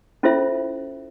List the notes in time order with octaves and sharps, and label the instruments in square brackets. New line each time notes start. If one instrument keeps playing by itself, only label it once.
[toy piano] C#4 E4 F4 A4 C5 E5